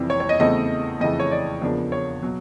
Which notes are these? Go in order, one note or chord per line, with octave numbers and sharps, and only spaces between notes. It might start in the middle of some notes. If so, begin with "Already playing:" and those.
Already playing: F2 C3 E3 G3
C#5
C#5
D#5
E2 C#3 E3 A3 C4 D#5
F2 C#3 E3 A3 D#5
C#5
D5
E2 C#3 F3 A#3 D4
C#5
B2 F#3